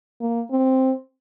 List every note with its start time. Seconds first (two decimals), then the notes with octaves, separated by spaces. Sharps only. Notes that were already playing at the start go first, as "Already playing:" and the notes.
0.21 A#3
0.51 C4